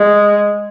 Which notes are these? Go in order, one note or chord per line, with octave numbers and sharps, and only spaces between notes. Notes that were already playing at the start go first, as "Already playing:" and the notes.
Already playing: G#3